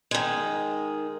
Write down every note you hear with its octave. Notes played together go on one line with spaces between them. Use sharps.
D#3 G#3